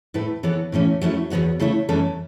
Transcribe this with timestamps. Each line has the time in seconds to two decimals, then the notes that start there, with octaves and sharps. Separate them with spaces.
0.14 A2 A3 E4 B4
0.43 E3 B3 A4 C#5
0.72 A2 E3 A3 C#4
1.01 F#3 A3 C#4 E4
1.30 E2 B2 B3 F#4 C#5
1.60 C#3 A3 E4 C#5
1.89 F#2 E3 A3 C#4 A4